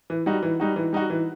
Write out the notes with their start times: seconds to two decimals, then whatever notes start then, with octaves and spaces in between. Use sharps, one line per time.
0.10 E3
0.26 G3 D#4 F#4
0.43 E3
0.60 G3 D#4 F#4
0.76 E3
0.93 G3 D#4 F#4
1.10 E3